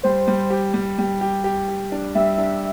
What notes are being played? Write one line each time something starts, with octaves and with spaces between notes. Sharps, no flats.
G3 C5
G3
G4
G3
G3
G4
G4
G4
D4
G3 E5
D4